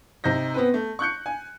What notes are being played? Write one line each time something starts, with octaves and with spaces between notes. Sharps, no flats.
C3 D#4 G6 A#6
B3 C4 B4
A3
C#6 F#6 G6 C#7
G#5